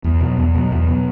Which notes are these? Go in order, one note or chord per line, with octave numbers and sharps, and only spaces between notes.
E2
B2
F#3
E2
B2 F#3
E2
B2 F#3